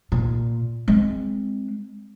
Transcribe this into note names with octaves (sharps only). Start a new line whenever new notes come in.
A#2
G#3 C4